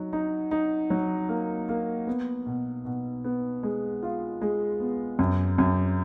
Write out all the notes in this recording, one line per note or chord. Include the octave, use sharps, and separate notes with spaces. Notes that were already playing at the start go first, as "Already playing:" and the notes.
Already playing: F#3 D#4
D#4
D#4
F#3
A#3
A#3
B3
B2
B2
B3
G#3
F4
G#3
B3
F#2
F#2